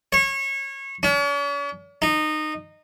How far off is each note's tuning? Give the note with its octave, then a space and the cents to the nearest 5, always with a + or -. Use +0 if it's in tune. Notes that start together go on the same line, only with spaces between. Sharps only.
C#5 -25
C#4 +45
D#4 -20